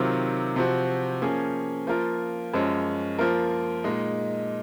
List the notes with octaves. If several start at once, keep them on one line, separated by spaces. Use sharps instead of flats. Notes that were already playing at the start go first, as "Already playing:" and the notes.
Already playing: C3 D#3 F#3 C4 F4
C3 F3 C4 F#4
F3 A#3 C#4 G#4
F3 A#3 F4 A#4
F#2 F3 G#3 C#4
F3 A#3 F4 A#4
A#2 G#3 D#4